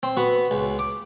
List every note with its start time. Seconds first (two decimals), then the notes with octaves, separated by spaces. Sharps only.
0.03 C4
0.17 B3 F#4
0.51 C#2
0.79 D6